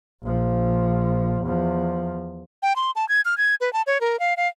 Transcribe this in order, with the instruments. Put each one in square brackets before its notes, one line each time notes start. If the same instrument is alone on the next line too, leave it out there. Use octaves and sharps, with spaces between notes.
[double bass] A#1 F3
E2 F3
[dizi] G5
C6
A5
G#6
F6
G#6
B4
A5
C#5
A#4
F5
F5